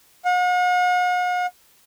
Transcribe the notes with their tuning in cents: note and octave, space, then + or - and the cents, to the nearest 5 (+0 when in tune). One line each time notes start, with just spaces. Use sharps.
F#5 -45